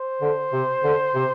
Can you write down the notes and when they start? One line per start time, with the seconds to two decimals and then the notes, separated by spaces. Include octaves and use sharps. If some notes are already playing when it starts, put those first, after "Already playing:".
Already playing: C5
0.22 D3
0.53 C3
0.84 D3
1.15 C3